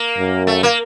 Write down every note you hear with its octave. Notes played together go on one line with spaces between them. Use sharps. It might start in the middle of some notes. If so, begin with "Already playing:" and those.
Already playing: A#3
F#2
A3
A#3